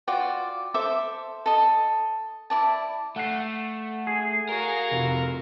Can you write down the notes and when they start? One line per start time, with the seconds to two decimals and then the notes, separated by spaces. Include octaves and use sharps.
0.07 F4 F#4 D5 G5
0.74 A4 C5 E5 D6
1.46 A4 D#5
2.50 E4 D5 A5
3.16 A3 F#5 F#6 C7
4.07 G#4
4.49 F#4 A#4 F5
4.91 F1 F4